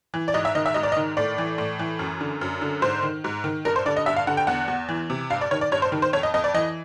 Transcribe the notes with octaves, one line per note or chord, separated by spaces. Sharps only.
E3
D5
G#2 D#5
E5
D#3 D#5
E5
G#2 D#5
D5
D#5
D#3
A2 D5
E3
A2
E3
F#2
D3
F#2
D3
G#2 C5
D#3
G#2
D#3
G2 A#4
C5
D3 D5
D#5
G2 E5
F5
D3 F#5
G5
E2 F#5
E2
E3
C3
G2 F5
D5
D#3 C#5
D5
G2 C#5
C5
D#3
C5
F2 C#5
D#5
F2 D#5
D5
E3 D#5